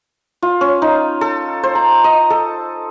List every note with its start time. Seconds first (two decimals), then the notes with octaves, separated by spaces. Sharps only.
0.42 F4
0.61 C#4
0.82 D#4
1.21 A4
1.63 C5
1.75 A#5
2.04 D#5
2.30 A4